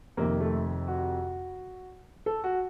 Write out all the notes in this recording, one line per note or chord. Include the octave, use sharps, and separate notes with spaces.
F2 C3 D#3 A#3
A3
F#4
A4
F#4